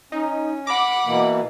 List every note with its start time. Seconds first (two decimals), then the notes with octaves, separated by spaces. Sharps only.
0.12 C#4 D#4
0.67 F#5 B5 D6
1.06 B2 E3 A#3